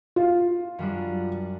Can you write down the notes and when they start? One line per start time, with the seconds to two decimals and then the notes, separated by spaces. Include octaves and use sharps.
0.16 F4
0.79 F#2 G3 D4